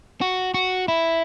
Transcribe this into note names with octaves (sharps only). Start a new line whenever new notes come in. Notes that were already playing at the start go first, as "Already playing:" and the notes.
F#4
F#4
E4